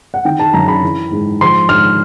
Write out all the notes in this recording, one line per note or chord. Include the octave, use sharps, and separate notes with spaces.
F#5
D#3 G5
A5
F#2 A#5
B5
E3
G#2
F3 C6
G#2 F6